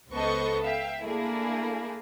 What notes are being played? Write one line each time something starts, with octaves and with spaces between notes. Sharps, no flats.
C#2 B3 A4 C5 D#5 C#6
E5 F5 G5
A3 A#3 D4 E4 G#4